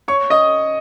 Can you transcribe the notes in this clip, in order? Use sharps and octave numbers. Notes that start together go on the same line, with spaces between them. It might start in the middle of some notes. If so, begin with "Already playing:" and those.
C#5 C#6
D#5 D#6